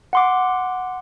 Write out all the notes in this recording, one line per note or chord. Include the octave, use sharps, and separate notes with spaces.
F#5 C6 D6